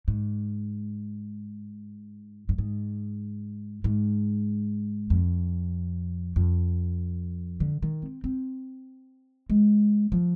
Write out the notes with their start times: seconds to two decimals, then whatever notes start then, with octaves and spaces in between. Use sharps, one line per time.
0.08 G#2
2.49 G2
2.58 G#2
3.84 G#2
5.10 F2
6.36 F2
7.60 D3
7.82 D#3
8.02 C4
8.24 C4
9.50 G#3
10.12 F3